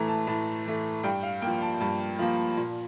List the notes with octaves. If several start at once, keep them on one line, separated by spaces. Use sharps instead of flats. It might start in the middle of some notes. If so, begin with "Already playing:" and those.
Already playing: A2 E3 A3 A#5
A5
A2 A5
E3 A3
G2 G5
F5
F3 A#3 G5
A5
G2 A5
F3 A#3
A#2